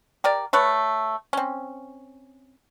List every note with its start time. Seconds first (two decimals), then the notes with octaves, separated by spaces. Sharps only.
0.24 G4 A#4 D5
0.53 A3 B4 C#5
1.33 C4 C#4